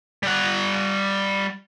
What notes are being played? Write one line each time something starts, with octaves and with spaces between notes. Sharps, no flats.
G3 F#5